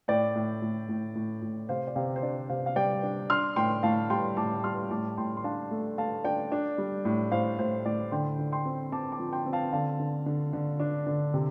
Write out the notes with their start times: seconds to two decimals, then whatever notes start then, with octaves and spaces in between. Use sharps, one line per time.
0.08 A2 D5 G5
0.35 A2
0.62 A2
0.89 A2
1.15 A2
1.42 A2
1.69 C3 C5 F5
1.87 D5
1.96 C3 C5 F5
2.16 C5
2.22 D4 D5
2.49 C3 C5 F5
2.66 F5
2.76 G3 D5 G5
3.03 D4
3.30 D4 C6 F6
3.56 A2 G5 C6
3.83 A2 F5 A5
4.10 G3 G5 C6
4.37 A2 A5 D6
4.64 G3 C6 F6
4.91 A2 A5 D6
5.17 A2 G5 C6
5.37 C6
5.44 D4 F5 A5
5.71 A3
5.97 A3 F5 A5
6.24 D4 D5 G5
6.52 D4
6.78 G3
7.05 A2
7.31 A2 C5 F5
7.59 A2 C5
7.85 A2 D5
8.12 D3 G5 C6
8.39 D3
8.52 G5 C6
8.65 C4
8.92 C4 A5 D6
9.12 A5 D6
9.19 F3
9.33 G5 C6
9.46 C4
9.53 F5 A5
9.73 D3 F5 A5
10.00 D3
10.26 D3
10.53 D3
10.80 D4
11.07 D3
11.34 C3